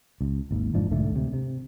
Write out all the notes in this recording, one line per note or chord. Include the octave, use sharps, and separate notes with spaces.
C#2
G#1 D#2
F1 G#2 F3 D4
B1 G#2 D3 A3
D2 C3
C3